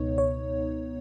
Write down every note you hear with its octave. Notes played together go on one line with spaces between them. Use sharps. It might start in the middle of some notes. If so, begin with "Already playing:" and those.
Already playing: C#2 B2 B3 D#4 C#5
C#5